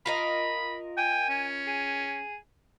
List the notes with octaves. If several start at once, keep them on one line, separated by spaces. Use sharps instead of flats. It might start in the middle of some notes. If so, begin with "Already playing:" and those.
F4 A#4 D#5 B5
G5 G#5
C#4
G#4